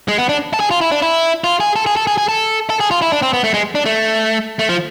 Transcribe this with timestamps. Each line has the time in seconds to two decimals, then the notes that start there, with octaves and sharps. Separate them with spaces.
0.08 G#3
0.18 B3
0.29 D4
0.54 A4
0.60 G#4
0.71 F4
0.81 E4
0.92 D4
1.02 E4
1.44 F4
1.60 G#4
1.76 A4
1.86 G#4
1.96 A4
2.07 G#4
2.18 G#4
2.29 A4
2.70 A4
2.80 G#4
2.91 F4
3.02 E4
3.12 D4
3.22 C4
3.33 B3
3.44 A3
3.54 G#3
3.75 D4
3.86 A3
4.59 A3
4.69 F3